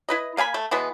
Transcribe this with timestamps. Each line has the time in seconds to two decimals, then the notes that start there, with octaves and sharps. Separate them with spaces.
0.09 E4 B4 D#5
0.37 A#3 F5 G#5 B5
0.54 A3
0.71 B2 E3 G#3 B3